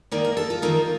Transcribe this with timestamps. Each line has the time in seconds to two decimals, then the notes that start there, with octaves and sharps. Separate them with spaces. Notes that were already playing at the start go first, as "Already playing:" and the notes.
0.11 D#3 A#3 D#4 D5
0.24 A#4
0.37 A4
0.50 F4
0.62 D#3 A#3 D#4